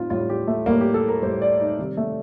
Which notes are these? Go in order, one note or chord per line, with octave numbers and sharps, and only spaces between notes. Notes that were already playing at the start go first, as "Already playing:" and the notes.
Already playing: A2 G3 C4 D#4 F4
A2 G3 F4
G4
A3
A2 G3 A#3
G4
A4
A#4
A2 G3 C5
D5
D#4
C3 D#3 G3
A3